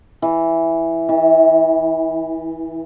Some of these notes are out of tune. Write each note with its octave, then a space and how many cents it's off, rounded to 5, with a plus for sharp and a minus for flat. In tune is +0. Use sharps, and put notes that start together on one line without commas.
E3 +0
E3 -35